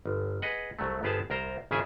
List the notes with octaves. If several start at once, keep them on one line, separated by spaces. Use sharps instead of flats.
G1
G#4 B4 D#5 F#5
C2 F#3 A3
G1 B3 G4 G#4 C5 A5
C2 A#4 C5 A#5
G#1 C#3 E4 G#4 E5 G#5